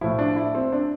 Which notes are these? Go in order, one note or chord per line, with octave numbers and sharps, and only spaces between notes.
A2 F3 E4
D4
E4
C4
D4